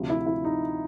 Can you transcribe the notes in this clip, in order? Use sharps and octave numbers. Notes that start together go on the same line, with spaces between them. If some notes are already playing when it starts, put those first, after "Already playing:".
Already playing: D2 C3 F3
E4
E4
D#4